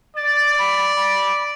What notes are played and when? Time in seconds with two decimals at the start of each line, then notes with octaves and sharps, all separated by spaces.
0.16 D5 A6
0.58 B5
0.95 B5